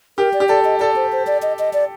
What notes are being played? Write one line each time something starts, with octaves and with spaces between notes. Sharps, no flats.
G4 A#4
D5
G4
A4 D5
D#5
A4 D5
C5
C5
D5
D#5
D#5
D5